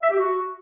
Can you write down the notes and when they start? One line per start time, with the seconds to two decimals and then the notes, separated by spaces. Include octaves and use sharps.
0.02 E5
0.10 G4
0.18 F#4